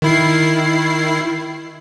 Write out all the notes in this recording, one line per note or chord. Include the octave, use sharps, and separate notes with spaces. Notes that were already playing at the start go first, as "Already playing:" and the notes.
D#3 E4 C7